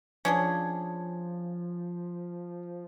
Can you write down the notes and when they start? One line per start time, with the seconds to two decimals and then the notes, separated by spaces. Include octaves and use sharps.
0.25 F3 C#4 D4 G#4